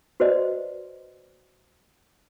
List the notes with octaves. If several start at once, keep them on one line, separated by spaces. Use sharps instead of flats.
F#4 B4 C5 D5 D#5